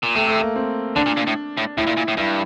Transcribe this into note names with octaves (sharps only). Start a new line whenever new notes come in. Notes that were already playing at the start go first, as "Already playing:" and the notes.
A#2
C3 A3
A3
A#3
C4
D3 D4
A#2
A#2
A2
A2
A2 E4
A#2
A#2
A2
G2 E4